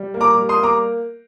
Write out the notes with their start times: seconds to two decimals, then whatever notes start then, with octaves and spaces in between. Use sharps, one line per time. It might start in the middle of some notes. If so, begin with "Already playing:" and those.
Already playing: G3
0.14 A#3
0.21 A#5 D6
0.35 G3
0.49 C6 D#6
0.56 A#3
0.63 A#5 D6